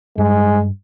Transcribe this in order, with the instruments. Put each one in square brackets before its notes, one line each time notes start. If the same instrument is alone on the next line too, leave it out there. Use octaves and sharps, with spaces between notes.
[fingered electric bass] G2 [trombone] G#3